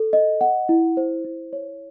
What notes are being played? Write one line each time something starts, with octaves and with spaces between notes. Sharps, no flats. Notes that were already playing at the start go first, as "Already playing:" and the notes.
Already playing: A4
D#5
F#5
E4
C5
E4
C#5